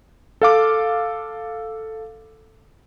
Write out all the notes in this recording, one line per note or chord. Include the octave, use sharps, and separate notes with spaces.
A4 F5 D6